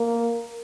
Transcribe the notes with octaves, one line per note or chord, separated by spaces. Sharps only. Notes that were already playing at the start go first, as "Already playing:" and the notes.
Already playing: A#3